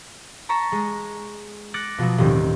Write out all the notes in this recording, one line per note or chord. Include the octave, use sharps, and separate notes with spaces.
A5 A#5 C#6 A6 B6 E7
G#3
D6 F#6 A6 A#6 C#7
B2 F3 F#3 B3
D#1 A2 D#3 C4